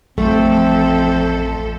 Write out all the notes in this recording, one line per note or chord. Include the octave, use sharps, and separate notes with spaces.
A1 F2 A3 C4 A4